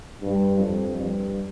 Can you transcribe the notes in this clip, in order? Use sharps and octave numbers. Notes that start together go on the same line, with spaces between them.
G2
F2
G2